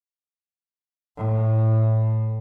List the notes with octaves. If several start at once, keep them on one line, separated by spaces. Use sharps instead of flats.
A2